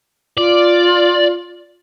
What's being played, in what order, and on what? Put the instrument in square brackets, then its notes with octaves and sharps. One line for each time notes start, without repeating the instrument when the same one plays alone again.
[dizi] F4 [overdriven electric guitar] D5